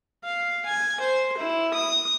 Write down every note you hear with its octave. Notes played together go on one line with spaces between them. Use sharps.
F5
G#5
C5
E4
D#6